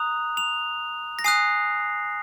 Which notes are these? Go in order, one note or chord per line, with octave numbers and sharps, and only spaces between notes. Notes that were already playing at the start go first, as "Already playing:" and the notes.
Already playing: A#5 D#6 F#6 F7
F7
A#6
G#5 D#6 F#6 C7